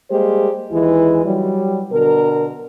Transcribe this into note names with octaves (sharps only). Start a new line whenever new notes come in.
G3 G#3 A#3 G4 C5
D#2 E3 G#3 E4
F#3 G3
B2 D3 A#4